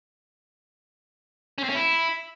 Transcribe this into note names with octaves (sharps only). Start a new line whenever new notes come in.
C#4
C4
C#4
E4